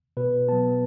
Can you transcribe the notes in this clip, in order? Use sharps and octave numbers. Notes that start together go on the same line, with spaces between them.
B2 B4
F#3 B3 A5